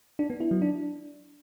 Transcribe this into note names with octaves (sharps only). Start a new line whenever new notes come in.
D4
B3
E4
F#3
D4